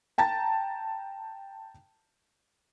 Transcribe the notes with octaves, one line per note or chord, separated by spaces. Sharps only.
G5 A5 A#5 A6